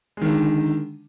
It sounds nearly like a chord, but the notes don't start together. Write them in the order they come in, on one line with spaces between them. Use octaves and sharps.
G#3 D#3 D3